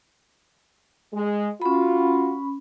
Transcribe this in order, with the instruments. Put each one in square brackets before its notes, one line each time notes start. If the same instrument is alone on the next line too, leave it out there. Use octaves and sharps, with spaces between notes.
[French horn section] G#3
[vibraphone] C#4 B5 [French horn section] F4 F#4